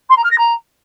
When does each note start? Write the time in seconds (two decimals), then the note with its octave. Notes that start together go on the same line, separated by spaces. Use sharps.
0.09 C6
0.16 A#5
0.23 F6
0.31 A#6
0.38 A#5